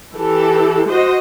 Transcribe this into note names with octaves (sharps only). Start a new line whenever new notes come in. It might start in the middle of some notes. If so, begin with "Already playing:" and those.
E3 G4 A4
F#4 C5 D#5